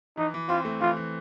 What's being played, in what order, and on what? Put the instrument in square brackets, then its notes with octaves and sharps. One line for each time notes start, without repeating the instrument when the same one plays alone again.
[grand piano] E3 [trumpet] D#4
[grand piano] E3
[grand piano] C4 [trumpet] F4
[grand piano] A3
[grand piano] E3 [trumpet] F4
[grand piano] E3